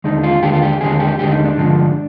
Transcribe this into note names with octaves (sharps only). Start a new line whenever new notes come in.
D#2 D3 G#3 D#4
F4
D#2 D3 G#3 G4
F4
G4
D#2 D3 G#3 G#4
G4
D#2 D3 G#3 G4
D#4
D4
G2 D3 F3 G#3